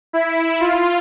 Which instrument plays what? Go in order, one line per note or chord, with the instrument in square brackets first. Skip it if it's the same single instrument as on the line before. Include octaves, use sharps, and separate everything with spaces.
[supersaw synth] E4
F4